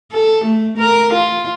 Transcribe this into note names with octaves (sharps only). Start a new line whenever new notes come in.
A4
A3
A#4
F4